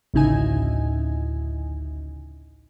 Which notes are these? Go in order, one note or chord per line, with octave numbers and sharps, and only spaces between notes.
A1 D2 C#3 D#4 E4 G#5